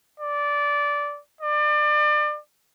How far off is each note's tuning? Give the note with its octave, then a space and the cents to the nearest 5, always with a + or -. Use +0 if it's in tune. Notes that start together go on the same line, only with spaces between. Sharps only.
D5 -15
D5 +30